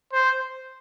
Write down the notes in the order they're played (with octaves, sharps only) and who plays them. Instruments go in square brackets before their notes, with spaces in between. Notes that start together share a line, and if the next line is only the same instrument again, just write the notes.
[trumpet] C5